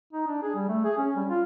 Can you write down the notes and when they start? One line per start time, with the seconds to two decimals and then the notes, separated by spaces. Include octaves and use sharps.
0.13 D#4
0.27 D4
0.42 G#4
0.55 G3
0.68 A3
0.84 G#4
0.98 C#4
1.16 G3
1.29 F4